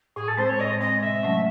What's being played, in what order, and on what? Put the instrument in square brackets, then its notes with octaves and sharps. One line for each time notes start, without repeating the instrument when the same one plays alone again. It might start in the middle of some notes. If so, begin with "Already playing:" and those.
[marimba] A2 [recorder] G#4
[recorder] A4
[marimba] G#3 C4 [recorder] C5
[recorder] C#5
[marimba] A2 [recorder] D#5
[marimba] G#3 C4 [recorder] D#5
[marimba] C3 [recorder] E5
[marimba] F#3 A3 C#4